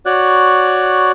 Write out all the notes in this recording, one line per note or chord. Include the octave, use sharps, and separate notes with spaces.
F#4 C#5 D5 F#6